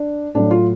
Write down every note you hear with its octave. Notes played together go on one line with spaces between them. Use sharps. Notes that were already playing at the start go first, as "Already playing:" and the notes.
Already playing: D4
A2 F#3 D4
F4